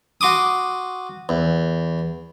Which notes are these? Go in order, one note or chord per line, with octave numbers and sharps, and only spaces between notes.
F#4 C6 D6 D#6
E2